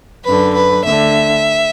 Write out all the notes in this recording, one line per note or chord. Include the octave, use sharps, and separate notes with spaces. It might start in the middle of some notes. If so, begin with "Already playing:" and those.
F#2 D3 B4
B4
D2 D3 E5